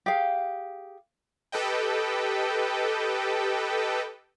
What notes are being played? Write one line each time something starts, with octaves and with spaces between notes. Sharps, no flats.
G4 G#4 F5
G4 A4 B4 D#5 G5